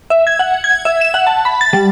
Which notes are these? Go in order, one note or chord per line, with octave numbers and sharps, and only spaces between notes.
E5
G#6
F#5
G#6
E5
E7
F#5
A5
B5
A6
G3